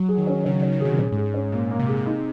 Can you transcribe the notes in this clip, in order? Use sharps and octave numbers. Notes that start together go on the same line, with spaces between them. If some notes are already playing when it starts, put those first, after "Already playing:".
Already playing: F#3
G#4
D#3
C#4
C#3 C#4
D#3 C#5
D#3
C3 G#4
A#2 C#4
G#2
G#4
G#2
C#4
A#2 A#3
A#3
C3
A#2 G#4
C3
D#4